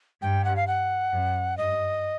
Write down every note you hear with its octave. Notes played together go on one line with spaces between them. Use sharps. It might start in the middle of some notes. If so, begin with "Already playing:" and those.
G2 G5
F#5
F5
F#5
F#2
G2 D#5